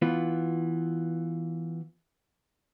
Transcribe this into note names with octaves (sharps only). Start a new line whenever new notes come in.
E3 B3 F4